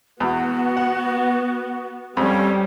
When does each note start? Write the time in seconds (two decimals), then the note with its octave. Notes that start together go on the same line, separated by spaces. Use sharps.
0.20 E2 B3 F#4
0.77 F#5
2.17 F2 G3 C#4